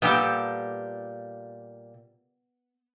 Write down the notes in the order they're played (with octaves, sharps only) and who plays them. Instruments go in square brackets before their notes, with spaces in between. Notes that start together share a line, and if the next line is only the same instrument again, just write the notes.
[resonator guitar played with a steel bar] A#2 G3 [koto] B3 G4 A4